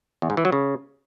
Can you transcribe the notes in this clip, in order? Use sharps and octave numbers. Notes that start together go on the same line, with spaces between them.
E2
G#2
E3
F#3
C#3